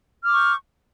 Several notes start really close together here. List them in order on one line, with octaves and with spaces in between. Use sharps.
F6 D6 C#6 G6